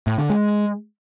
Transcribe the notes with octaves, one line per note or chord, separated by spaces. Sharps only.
A2
D3
G#3